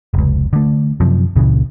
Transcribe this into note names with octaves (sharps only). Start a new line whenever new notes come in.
F1 C#2
D3 A3
F#2 C3 F3
C#2 A#2 C#3 E3